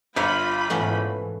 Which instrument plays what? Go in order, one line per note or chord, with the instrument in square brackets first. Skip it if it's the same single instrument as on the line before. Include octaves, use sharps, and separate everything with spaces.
[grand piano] G1 [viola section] F4 B5 [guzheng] C#5 E5 F5
[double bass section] G#2 B2 E3 [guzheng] A3 B3 C#4